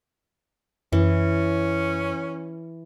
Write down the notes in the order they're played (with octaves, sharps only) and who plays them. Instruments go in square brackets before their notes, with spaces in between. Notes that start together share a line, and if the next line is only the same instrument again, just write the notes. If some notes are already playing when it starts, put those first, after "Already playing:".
[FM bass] F#2 [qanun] E3 [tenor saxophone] C#4